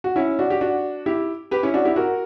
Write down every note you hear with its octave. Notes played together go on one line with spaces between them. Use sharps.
F#4
C#4 E4
D4 F#4
G4
D4 F#4
E4 G4
G4 B4
C#4 E4
D4 F#4
E4 G4
F#4 A#4